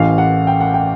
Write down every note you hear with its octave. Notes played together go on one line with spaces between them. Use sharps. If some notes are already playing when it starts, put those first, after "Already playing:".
Already playing: A1 A2 E3 F5
F#5
G5
F#5
G5